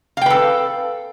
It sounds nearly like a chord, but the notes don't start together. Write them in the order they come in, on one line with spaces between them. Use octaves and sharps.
F5 G5 B4 A4